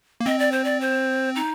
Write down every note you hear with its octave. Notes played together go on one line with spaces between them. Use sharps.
A#3
C4 D#5
D5
C5
D5
C5
D#4